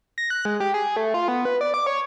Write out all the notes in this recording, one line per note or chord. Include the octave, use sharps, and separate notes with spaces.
A#6
F#6
G#3
G4
G#4
A3
F4
B3
B4
D5
D6
C#5